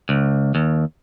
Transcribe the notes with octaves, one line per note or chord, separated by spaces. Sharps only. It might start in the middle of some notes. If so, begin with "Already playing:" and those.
C#2
D#2